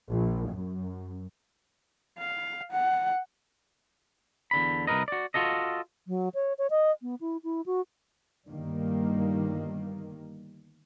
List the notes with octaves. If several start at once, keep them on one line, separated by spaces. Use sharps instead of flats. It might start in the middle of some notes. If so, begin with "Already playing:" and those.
A#1
F#2
F5
F#5
E2 D3 B5
C2 B2 A#4 B4 D#5
F#4 D5
F4 F#4 A4 D#5
F#3
C#5
C#5
D#5
B3
E4
E4
F#4
G1 G2 D#3 G3 A#3